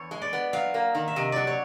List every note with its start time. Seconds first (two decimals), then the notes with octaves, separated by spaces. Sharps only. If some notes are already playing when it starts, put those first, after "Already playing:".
Already playing: E2 C#5
0.11 G#3
0.22 D5
0.33 B3
0.53 F#3 F5
0.74 A#3
0.95 D#3
1.08 E5
1.16 C3 D#5
1.32 F#3 D5
1.47 C#5